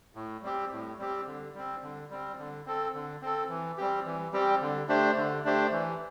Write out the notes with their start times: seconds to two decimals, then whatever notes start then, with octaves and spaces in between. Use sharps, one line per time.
0.15 A2
0.42 G3 C4 G4
0.71 A2
0.99 G3 C4 G4
1.26 D3
1.54 G3 C4
1.82 D3
2.10 G3 C4
2.38 D3
2.66 C4 A4
2.94 D3
3.22 C4 A4
3.49 E3
3.77 G3 C4 G4
4.06 E3
4.33 G3 C4 G4
4.61 D3
4.89 A3 D4 G4 C5
5.17 D3
5.45 A3 D4 G4 C5
5.72 E3